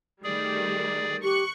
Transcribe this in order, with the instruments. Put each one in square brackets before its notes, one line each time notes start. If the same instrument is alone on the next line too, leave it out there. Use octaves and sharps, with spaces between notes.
[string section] D#3 G3 A3 [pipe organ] G#4 D5
[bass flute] G4 [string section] C#6 F#6